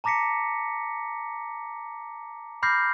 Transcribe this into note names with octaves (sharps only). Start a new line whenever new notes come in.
A5 A#5 D6 A#6 B6 C#7
B5 D6 F6 G6 A#6 C7